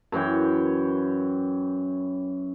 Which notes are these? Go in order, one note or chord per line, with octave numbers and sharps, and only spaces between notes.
F#2 E3 C#5 G5